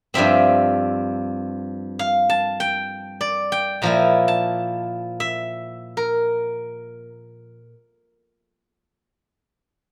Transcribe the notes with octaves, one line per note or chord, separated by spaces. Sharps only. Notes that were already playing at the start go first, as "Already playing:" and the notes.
G2 F3 C4 E5
F5
A5
G5
D5
G5
A#2 F3 A#3 E4 A#5
A5
E5
A#4